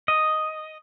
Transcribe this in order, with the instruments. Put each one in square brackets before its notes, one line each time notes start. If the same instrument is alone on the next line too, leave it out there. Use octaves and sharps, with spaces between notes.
[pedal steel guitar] D#5